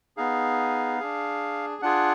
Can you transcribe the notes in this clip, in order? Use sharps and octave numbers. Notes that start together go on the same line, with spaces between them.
B3 D#4 G#4 F5
D4 G#4
D4 F4 G#4 F#5